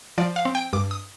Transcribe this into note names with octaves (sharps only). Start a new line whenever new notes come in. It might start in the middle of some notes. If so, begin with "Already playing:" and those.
F3 D5
F5
C4
G5
G2 D6
D#6